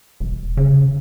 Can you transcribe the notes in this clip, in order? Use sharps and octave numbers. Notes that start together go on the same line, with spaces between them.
E1
C#3